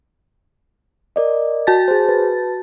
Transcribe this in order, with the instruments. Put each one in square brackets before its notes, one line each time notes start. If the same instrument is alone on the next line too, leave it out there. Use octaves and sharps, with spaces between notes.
[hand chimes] A#4 D5 D#5
[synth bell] F#4 A5 A6
[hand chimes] G#4 C5
B4